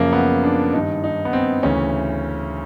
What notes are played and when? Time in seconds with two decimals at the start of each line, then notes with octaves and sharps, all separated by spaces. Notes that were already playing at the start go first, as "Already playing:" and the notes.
Already playing: F#2 C#3 F3 A#3
0.13 B3
0.44 D4
0.73 G2 D#3 D#4
1.04 D#4
1.25 B3
1.33 C4
1.63 D2 C#3 E3 C#4